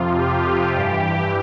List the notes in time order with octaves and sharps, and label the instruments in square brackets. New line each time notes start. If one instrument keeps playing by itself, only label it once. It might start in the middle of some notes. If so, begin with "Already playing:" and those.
Already playing: [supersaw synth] F2 C3 F3 F4
G4
G2 E3